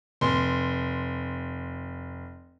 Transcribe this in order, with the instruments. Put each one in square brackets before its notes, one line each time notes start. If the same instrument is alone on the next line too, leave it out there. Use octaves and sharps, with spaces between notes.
[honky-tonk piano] F1 C6